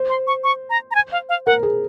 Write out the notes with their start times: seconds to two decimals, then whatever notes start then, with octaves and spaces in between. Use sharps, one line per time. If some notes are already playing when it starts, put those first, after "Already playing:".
Already playing: C5
0.10 C6
0.27 C#6
0.44 C#6
0.70 A#5
0.91 A#5
0.95 G#5
1.12 F5
1.29 F5
1.46 A#4 F#5
1.63 G#4